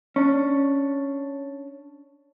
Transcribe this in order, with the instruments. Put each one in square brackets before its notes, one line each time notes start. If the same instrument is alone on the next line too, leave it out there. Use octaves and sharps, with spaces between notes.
[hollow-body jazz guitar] C#4 D4